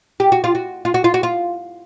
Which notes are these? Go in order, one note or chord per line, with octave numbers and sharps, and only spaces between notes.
G4
F#4
F4
F#4
F4
F#4
F4
F#4
F4